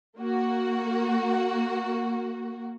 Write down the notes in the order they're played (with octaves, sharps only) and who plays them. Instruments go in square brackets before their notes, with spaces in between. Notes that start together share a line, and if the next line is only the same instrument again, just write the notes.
[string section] A#3 F#4